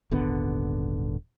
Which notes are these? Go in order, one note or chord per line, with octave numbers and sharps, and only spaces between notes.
D#1 G#1 D3 B3